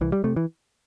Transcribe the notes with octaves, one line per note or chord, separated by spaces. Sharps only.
C2 E3
G3
C3 A3
E3